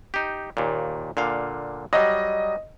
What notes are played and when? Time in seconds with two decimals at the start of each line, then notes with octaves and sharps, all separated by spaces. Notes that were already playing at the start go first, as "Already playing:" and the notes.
0.14 D#4 G4
0.57 D#2 A#2
1.17 A#2 D3 F5
1.93 F#3 G3 D#5